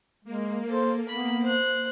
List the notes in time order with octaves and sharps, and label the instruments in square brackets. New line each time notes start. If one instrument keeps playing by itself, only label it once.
[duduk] G#3 [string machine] A#3
[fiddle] A4 [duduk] C5
[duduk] B3 [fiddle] B5
[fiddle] C5 F#6